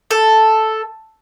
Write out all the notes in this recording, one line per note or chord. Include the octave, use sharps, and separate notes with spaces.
A4